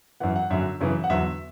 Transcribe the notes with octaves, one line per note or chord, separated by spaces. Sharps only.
F#2 E3 F#5
F#5
F#2 D3 F#3 E5
F#2 C#3 E3
F#5
E2 D3 F#3 E5